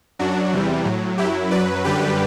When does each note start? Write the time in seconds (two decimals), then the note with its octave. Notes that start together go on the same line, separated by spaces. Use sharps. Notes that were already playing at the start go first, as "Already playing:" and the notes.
0.19 F#2 F#3 D4 F#4
0.52 E2 C3 E3 G3
0.85 A2 F#3
1.18 F#2 F#3 E4 G4
1.51 F#2 F#3 B4 D5
1.84 F#2 D3 G3 G4 B4